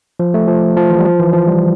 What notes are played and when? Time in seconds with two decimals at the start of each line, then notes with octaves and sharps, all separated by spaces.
0.20 F3
0.34 A3
0.48 F3
0.76 F3
0.90 E3
0.99 G3
1.05 F3
1.20 E3
1.33 F3
1.47 G3